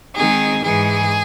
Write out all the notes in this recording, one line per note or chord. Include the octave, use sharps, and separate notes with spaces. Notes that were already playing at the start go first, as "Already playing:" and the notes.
D#3 G#3 C4 D#4 G#4
G#2 E3 G#3 G#4